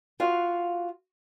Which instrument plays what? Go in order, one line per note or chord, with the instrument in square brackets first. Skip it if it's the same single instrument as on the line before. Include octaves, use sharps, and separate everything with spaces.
[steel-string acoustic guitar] F4 F#4 F5